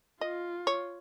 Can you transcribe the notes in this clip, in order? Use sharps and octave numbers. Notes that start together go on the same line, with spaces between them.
F4 D#5
C#5